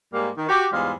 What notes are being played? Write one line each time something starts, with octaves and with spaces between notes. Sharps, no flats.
G#2 G3 A#3
D#3
F#4 G4
E2 G#2 G3 G#3 F4